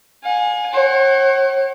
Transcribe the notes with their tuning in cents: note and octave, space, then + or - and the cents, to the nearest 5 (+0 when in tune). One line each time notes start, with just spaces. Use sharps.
F5 +45 G#5 +0
C#5 -40 F#5 +40